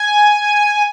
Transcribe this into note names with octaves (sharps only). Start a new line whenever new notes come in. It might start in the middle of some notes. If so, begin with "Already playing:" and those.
Already playing: G#5